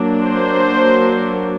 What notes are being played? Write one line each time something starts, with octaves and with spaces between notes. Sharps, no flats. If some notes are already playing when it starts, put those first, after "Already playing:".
Already playing: F#3 A#3 D4
C5